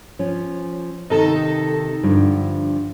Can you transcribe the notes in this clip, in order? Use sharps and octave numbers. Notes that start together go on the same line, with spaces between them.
F3 C#4
C3 D#3 D#4 A4
G2 D3 F3